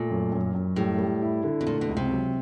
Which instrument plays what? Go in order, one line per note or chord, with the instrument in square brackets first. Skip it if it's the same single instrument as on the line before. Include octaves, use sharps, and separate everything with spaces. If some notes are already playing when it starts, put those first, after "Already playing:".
Already playing: [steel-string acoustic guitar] A#2 [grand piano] A3
[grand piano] F#2
F#2
F#2
[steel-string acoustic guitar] A2 [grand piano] G3
[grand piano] G3
E4
D3
[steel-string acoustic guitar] B2
[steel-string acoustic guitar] A#2 [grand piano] A3
[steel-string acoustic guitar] B2
[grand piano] C#2
[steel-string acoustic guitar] C3
[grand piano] F#3